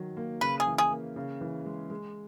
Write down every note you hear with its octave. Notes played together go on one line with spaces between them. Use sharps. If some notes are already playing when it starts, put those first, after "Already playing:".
Already playing: D#3 F#3
A#3
C#3 B4
G#4
E3
G#4
A#3
C#3
E3
G#3
G#3